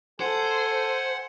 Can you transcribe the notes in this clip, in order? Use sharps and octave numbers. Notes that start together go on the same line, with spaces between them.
A4 C5 F#5 G#5